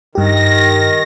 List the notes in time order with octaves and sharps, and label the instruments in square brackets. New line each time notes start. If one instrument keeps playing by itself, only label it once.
[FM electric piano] G2 G4 [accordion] D#3 [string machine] A#6